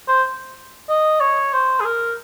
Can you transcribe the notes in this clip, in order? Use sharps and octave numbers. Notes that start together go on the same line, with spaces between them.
C5
D#5
C#5
C5
G#4
A#4